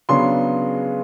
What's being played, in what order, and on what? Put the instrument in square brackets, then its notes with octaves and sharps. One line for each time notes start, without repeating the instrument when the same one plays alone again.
[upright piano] C#3 F#3 B3 D4 C6